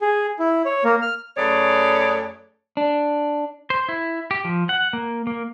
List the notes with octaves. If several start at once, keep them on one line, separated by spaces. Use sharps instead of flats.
G#4
E4
C#5
A#3
F6
F#2 A3 G#4 B4 C#5 D5
D4
C5
E4
G4
F3
F#5
A#3
A#3